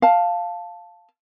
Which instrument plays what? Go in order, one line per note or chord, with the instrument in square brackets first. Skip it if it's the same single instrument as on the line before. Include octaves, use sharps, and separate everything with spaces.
[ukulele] F5 A5